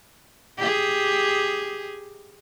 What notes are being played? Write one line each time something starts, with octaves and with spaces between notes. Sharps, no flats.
G4 G#4